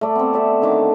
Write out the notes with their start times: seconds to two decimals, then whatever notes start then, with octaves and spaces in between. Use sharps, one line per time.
0.01 A3 D5
0.15 B3 C4
0.33 A4 D5 E5
0.62 D3 D#3 D6